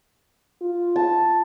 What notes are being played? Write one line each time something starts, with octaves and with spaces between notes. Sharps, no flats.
F4
A5